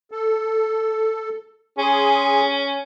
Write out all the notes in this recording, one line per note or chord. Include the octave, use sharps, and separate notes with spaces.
A4
C#4 G#4 G#5 C6